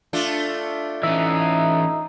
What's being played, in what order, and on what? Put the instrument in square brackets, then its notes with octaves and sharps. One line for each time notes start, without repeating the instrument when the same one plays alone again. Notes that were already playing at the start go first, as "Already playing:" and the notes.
[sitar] A3 D4 F4
[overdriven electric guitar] E3 C#4 [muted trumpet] D#4 [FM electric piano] E5